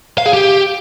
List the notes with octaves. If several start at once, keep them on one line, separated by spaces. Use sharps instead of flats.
F5
G#4
G4